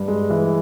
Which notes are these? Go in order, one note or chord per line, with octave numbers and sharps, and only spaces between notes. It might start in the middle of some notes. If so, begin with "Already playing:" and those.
Already playing: G2
G#3
E3